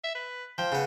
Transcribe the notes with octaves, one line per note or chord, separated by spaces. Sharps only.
E5
B4
F3 G5
C#3 B3